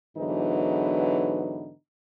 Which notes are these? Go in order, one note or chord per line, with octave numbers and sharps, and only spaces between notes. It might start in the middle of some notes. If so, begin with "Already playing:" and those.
G#2 D3 E3 F#3 B3 D#4